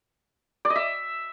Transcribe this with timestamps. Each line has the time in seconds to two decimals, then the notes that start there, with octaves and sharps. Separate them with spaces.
0.65 D5
0.70 D#5
0.76 E5